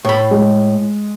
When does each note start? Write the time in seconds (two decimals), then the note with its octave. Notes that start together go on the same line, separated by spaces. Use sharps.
0.05 A2 B5
0.31 G#3